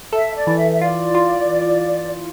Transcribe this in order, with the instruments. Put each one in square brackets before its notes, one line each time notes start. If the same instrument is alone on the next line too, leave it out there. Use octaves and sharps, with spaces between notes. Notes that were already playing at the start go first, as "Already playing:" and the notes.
[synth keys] A4 [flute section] E5
[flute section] D5
[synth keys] E3
[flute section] E5
E5
[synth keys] F4 [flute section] D5
[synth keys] F4